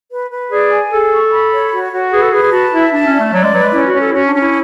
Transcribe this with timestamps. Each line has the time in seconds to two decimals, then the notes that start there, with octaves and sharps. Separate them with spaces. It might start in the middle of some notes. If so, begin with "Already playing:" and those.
0.11 B4
0.31 B4
0.51 G#4 D5
0.71 G#5
0.91 G#4 A4
1.11 C#6
1.32 B5
1.52 C#5
1.72 F#4
1.92 F#4
2.12 G#4 B4
2.22 A4
2.32 G#4 B4
2.43 G#4
2.52 F#4 A5
2.73 E4 E5
2.93 D4 A5
3.07 C#4
3.13 D5
3.20 A3
3.33 F#3 D5
3.44 G#3
3.53 F#3 B4
3.64 G#3
3.73 C#4 E4
3.87 F#4
3.94 C#4
4.01 A4
4.10 E4
4.13 C#4 F#4
4.27 D4
4.34 C#4
4.41 E4